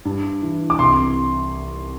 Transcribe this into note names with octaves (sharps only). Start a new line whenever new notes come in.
G2
E3
D6
C2 C6